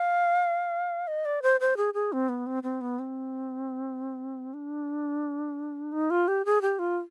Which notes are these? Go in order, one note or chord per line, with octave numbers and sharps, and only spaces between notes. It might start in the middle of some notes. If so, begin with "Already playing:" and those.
Already playing: F5
D#5
D5
C5
C5
G#4
G#4
C4
B3
C4
C4
B3
C4
D4
D#4
F4
G4
G#4
G4
F4